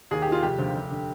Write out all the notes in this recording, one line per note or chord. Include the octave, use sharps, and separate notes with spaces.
D#2 G#4
D#3 G4
F4
F1 G4
D#2 D3 F3
F1
D3